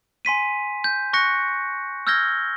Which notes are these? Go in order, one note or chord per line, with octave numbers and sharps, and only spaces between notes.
G#5 C6 B6 D#7
G6
C#6 F#6 A#6 C#7
E6 F6 G6 G#6 A#6 G7